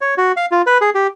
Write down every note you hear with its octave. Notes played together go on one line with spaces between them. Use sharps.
C#5
F#4
F5
F4
B4
G#4
G4